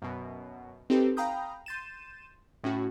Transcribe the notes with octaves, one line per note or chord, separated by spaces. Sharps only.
F#2 B2
C4 D#4 G4 A4 B4
F5 G5 A#5 B5 D#6 G6
C6 G6 A6 D#7 E7
A2 C#4 F#4